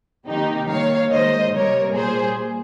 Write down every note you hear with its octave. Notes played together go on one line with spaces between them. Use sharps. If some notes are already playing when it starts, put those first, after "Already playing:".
C3 D#3 A#3 D#4 G4
D#3 G3 A#3 C#5 F5
D#3 G#3 C5 D#5
C3 G3 A#3 A#4 C#5
A#2 G3 A#3 G#4 C5